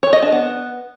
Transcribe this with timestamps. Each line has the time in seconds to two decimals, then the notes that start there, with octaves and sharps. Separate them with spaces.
0.03 C#5
0.13 D#5
0.22 D4
0.32 B3